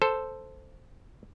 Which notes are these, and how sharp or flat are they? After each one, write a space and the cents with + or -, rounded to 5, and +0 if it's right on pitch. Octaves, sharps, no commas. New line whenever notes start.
A4 +0 C5 +0